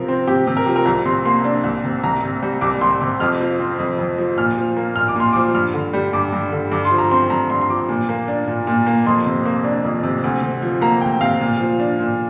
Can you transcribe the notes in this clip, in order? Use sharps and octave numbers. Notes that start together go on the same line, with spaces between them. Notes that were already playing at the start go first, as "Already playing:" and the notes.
Already playing: C3 F3 A#4
C4
C3 G4
C3
A#4
F3 G4
A#4
C2 A#5
C3 C6
A#3 C6
D4
C2
C3
C2 A#5
C3
G3
C2 D6
C2 C6
C3 D6
F2 F6
F3
C4
F2
F2
F3
A#2 F6
F3
A#3
A#2 F6
D6
A#2 C6
F3 D6
G2 F6
D3
G3
G2 D6
G2
D3
G2 D6
C6
F3
A#5
C4 C6
G2 A#5
G2 C6
C6
F3 D6
A#2
A#3
D4
A#2
A#2
A#3
F2 C6
C3
A#3
D4
F2
C3
D2
C3
F3
A#3 A#5
D2 G5
C3 F5
A#2
F3
D4
A#2